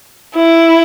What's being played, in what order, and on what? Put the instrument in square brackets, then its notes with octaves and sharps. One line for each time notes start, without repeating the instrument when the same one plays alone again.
[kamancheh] E4